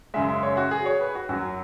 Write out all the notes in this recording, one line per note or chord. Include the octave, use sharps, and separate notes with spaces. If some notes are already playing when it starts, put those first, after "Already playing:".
F#2 C#3 G#3 E5
E5
C#5
F#4
G#4
C#5
B4
F#4
F#2 F#3 F#4